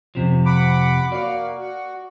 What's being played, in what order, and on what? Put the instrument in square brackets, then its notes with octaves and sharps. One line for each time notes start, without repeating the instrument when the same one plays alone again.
[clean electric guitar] F2 C3 F3
[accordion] F#5 B5 D6
[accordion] A#3 F#4 F5 [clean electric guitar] D5
[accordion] F#4